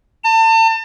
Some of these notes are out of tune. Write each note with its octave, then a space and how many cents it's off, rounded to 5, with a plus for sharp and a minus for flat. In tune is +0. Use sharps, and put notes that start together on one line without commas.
A5 +35